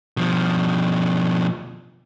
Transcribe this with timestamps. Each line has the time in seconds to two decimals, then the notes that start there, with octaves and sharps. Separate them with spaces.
0.17 B2 F3